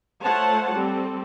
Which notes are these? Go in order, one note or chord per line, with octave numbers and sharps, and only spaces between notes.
A3 F4 C5 C#5 F#5 A5
G3 C4 A4